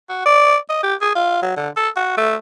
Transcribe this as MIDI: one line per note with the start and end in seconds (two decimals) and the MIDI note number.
0.09 0.24 66
0.26 0.57 74
0.70 0.80 75
0.83 0.94 67
1.02 1.13 68
1.15 1.42 65
1.43 1.52 54
1.57 1.69 50
1.77 1.89 69
1.96 2.16 66
2.17 2.35 57